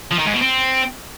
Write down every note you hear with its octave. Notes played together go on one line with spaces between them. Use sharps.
F3
D#3
G#2
B2
C4